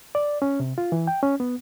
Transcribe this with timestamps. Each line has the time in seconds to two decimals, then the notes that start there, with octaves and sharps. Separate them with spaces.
0.15 D5
0.42 C#4
0.60 C3
0.78 F4
0.92 E3
1.07 G5
1.23 C#4
1.40 B3